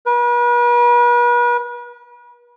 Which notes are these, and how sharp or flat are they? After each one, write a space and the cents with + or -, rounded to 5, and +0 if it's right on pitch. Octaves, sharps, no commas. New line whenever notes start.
B4 -40